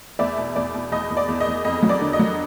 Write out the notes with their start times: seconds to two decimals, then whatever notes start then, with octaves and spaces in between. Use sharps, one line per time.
0.19 E2 D5 E5
0.37 B2
0.56 E2 D5
0.74 B2
0.92 E2 D#5
1.10 E2
1.17 D5
1.28 E2
1.40 D#5
1.47 E2
1.64 F2 D#5
1.83 F#3
1.89 D5
2.01 D3
2.13 D#5
2.19 F#3